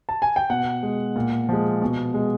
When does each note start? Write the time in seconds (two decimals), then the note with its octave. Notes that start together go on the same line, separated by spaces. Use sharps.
0.09 A5
0.22 G#5
0.36 G5
0.50 B2 F#5
0.83 G#3
1.16 A#2
1.49 F3 G#3
1.82 B2
2.14 G#3